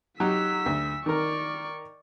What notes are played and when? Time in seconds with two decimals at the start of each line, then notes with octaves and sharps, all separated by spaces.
0.20 F#3 D#4 G4 E6 B6
0.66 D2
1.06 D#3 A#4 D5 C#6